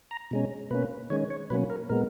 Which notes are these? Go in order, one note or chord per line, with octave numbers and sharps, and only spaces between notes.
A#5
B2 G#3 C#4
B2 A#3 C#4 B4
D#3 G#3 C#4 C#5
C#5
B2 F#3 A#3 C#4 B4
A#4
A#2 G#3 B3 A#4